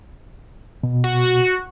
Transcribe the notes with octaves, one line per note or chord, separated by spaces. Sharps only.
B2
F#4